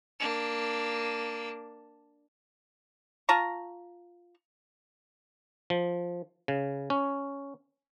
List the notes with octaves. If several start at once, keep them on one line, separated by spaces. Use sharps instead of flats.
A#3 D4
F4 A5 A#5 C#6
F3
C#3
C#4